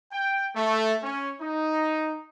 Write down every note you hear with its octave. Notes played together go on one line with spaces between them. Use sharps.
G5
A3
C#4
D#4